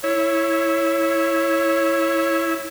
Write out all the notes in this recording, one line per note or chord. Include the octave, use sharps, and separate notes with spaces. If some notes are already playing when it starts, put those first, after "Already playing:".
E4 C#5